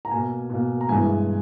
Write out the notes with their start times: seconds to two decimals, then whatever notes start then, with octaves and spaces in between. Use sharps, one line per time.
0.05 A#5
0.11 B2 A#3 G#5
0.50 B2 A#3
0.81 A#5
0.89 G2 E3 G#3 G#5